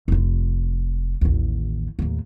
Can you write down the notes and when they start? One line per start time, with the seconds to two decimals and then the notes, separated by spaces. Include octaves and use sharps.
0.08 F1 F4
1.21 A1 D#2
1.99 D#2 A2